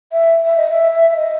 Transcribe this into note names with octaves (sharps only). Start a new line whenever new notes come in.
E5
E5
D#5
E5
E5
D#5